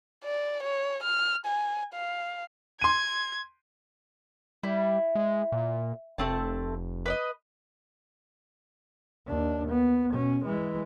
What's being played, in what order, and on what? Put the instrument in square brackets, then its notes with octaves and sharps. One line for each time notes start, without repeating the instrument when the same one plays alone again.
[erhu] D5
C#5
F6
G#5
F5
[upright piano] C6 D#7 [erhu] G#6
[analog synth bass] G3 [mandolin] E4
[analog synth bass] G#3
A#2
[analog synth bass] F1 [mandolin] A3 C4 A5
[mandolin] B4 D5 D#5
[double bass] D#2 D4
B3
B2 C#4
E3 G#3